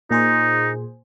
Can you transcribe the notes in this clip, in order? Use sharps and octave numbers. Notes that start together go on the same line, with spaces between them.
A#2 D#4 G#4 C5